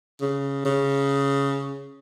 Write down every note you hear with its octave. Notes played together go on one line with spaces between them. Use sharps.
C#3
C#3